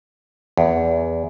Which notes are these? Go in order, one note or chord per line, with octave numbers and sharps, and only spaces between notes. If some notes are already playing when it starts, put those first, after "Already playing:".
E2